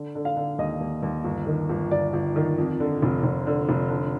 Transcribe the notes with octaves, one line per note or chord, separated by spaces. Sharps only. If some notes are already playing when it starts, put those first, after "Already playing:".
Already playing: D3
D3
F5
D3
D#2 D#5
D#2
D#2
G1
D#3
G1
G1 D5
G1
D#3
F2
D3
F1
F1
D3
F1
D3